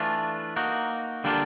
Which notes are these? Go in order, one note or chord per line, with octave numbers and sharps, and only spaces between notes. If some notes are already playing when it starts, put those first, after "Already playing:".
Already playing: E3 A3 D4 F4
A#3 D#4 F#4
D3 G3 A#3 D4 F4